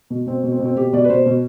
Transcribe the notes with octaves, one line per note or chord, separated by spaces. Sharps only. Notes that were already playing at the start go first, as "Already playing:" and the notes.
B2
B2 C4
B2
C4
B2
C4
B2 G4
B2 D5
B4
B2 C5
B2